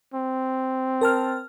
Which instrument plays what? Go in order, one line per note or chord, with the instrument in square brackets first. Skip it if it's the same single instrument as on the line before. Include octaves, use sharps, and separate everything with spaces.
[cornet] C4
[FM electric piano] A#4 A5 F6